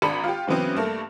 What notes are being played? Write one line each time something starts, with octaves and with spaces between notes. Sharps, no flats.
G#1 D4 A#5 B5 C#7
F4 G4
C#3 E3 F#3 B3 C4
G2 A3 A#3